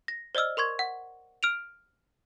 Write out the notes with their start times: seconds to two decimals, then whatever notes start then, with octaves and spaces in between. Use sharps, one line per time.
0.08 A#6
0.35 C5 D5 D#5 E6 F6
0.57 A#4 C6 C#6 G#6
0.79 F#5
1.43 F6 D7 F7